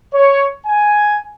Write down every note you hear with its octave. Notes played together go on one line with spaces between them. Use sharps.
C#5
G#5